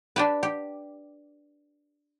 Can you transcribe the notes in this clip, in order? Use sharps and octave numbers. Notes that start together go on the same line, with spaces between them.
D4 G4 B4
G4